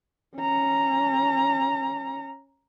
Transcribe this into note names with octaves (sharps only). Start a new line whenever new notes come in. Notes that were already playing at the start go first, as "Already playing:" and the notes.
C#4 A#5